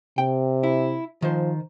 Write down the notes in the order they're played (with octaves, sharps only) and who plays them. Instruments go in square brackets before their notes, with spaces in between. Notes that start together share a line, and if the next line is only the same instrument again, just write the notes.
[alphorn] C3 [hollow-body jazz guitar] G5
[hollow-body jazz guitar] E4
[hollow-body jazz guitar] D#3 C5 [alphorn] F3